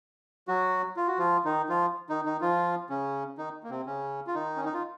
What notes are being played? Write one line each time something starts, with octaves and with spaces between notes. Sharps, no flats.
F#3 F#4
F4
F#4
F3 F4
D#3 D#4
F3 F4
D#3 D#4
D#3 D#4
F3 F4
C#3 C#4
D#3 D#4
A#3
C3 C4
C#3 C#4
F4
D#3 D#4
C#4
D#4
F4